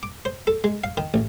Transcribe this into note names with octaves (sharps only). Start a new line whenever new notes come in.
D6
C5
A4
G#3
F5
D#3
A1